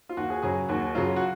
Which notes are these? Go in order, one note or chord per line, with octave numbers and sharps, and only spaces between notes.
F4
D#2 F#4
G#4
C#3 F#3 G#4
D#2 F#4
C#3 F#3 F4
F#4